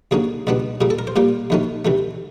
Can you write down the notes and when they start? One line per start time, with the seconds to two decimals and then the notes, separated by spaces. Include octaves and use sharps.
0.11 D#2 D3 F#3 A#3 C#4 G#4
0.47 C#2 B2 G3 B3 D4
0.81 A#2 G3 A#3 G#4
0.90 A4
0.99 A#4
1.07 C5
1.16 A#2 G3 A#3 G4
1.50 D#2 D#3 F#3 A3 C#4
1.85 D2 C3 E3 A3